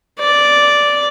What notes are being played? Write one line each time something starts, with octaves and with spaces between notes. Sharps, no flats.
D5